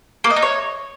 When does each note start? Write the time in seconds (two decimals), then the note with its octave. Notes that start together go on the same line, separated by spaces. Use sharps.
0.24 A#3
0.30 D#5
0.36 D#4
0.42 C#5